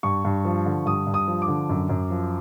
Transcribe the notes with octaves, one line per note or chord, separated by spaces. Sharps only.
G2 C#6
G2
F3
D3
G2 D#6
G2
D#6
F3
D6
D3
F#2
F#2
F3